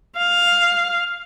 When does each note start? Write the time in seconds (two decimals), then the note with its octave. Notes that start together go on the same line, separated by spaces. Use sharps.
0.17 F5